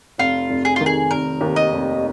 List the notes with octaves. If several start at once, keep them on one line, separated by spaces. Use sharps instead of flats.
F1 F4
F1
G#4
D#3 F4
G#4
F1 A#4
D#2
D#5
F1